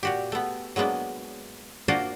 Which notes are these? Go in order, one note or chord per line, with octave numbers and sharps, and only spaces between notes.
A#2 F#4 G4
A3 B3
F#3 G#3 A#3 B3 D4
A#3 D4 F4 F#4 A#4 C5